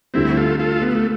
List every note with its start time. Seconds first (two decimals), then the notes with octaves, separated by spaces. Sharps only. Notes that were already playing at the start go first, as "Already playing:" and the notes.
0.14 D2 D3 G3 C4 E4
0.37 F4 A4
0.59 F4 A4
0.82 B3
0.95 A3